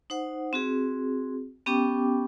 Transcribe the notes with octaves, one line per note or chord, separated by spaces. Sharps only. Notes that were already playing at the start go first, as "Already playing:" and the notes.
D#4 C5 F#5
C4 F#4 G#4
B3 C#4 G4 G5 D6